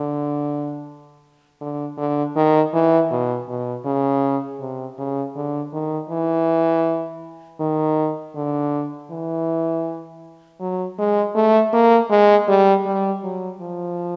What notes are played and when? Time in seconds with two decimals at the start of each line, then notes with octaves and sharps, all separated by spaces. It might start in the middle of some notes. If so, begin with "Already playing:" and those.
Already playing: D3
1.61 D3
1.97 D3
2.35 D#3
2.73 E3
3.11 B2
3.48 B2
3.85 C#3
4.60 C3
4.98 C#3
5.36 D3
5.73 D#3
6.10 E3
7.60 D#3
8.35 D3
9.11 E3
10.60 F#3
10.98 G#3
11.35 A3
11.73 A#3
12.10 G#3
12.48 G3
12.86 G3
13.23 F#3
13.61 F3